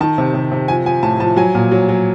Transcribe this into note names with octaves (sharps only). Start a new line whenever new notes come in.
D#3 A5
C3
C3
C3
F3 G#5
F3 G#5
A2 A5
F3 A5
F#3 G#5
A#2
F#3
F#3